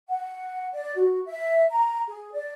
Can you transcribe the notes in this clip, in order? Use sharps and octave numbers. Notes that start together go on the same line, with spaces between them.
F#5
D5
F#4
E5
A#5
G#4
D5